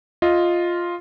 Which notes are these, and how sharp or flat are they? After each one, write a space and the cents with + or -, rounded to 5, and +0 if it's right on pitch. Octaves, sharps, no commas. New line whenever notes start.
F4 +0 D#5 +0